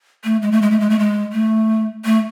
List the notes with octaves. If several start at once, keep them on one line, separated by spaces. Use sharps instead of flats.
A3
G#3
A3
G#3
A3
G#3
A3
G#3
A3
A3